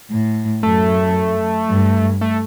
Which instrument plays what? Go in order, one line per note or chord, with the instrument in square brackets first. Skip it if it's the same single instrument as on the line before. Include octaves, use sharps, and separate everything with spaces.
[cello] A2
[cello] F#2 [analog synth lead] A3
[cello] G2
[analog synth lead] A3